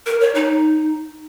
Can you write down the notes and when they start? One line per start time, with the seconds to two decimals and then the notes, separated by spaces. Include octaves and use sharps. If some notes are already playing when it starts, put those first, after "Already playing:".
0.06 A#4
0.21 C#5
0.35 D#4